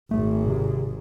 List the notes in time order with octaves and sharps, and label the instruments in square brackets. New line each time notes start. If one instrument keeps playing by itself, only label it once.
[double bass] G#1 G#2 [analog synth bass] A3
[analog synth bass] C3